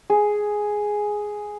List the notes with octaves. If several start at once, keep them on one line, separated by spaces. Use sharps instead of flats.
G#4